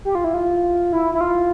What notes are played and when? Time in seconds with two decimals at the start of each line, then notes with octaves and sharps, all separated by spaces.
0.05 G4
0.15 F4
0.24 E4
0.34 F4
0.93 E4
1.14 E4
1.21 F4